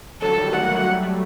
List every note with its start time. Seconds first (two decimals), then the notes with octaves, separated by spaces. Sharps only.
0.22 D3 F#3 A4
0.37 D#3 G3
0.53 A3 F#5
0.62 A#3
0.72 F#3 A3
0.89 G3
1.03 A3